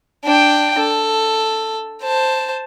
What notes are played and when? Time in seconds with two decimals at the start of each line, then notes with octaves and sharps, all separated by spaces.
0.25 D4 G5
0.79 A4
2.03 C5 A5